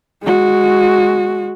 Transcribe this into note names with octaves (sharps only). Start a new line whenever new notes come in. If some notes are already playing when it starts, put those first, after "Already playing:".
G#3 F#4